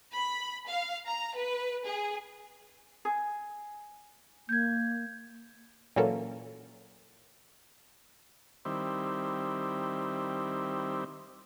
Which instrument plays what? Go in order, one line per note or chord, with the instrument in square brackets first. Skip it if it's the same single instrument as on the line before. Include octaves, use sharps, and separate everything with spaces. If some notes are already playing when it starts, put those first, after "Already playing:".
[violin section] B5
F5
A#5
B4
G#4
[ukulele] G#4
[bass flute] A#3 [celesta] G6 G#6
[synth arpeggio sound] A#2 E3 F#3 A#3 C#4 A4
[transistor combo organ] D#3 G3 C4 E4